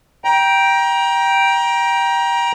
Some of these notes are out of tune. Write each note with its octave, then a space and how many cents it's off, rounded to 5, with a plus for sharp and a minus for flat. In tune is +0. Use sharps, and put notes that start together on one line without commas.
G5 +0 A#5 +25